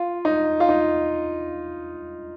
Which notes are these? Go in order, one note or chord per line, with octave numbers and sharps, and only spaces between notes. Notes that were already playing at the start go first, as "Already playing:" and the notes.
Already playing: F4
D#4
F4
D#4